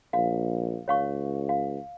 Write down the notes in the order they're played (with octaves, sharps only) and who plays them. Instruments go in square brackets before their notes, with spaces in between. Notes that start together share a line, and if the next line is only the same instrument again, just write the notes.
[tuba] A#1 [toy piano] F5
[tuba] C#2 [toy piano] C#5 F5 C#6
[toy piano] F5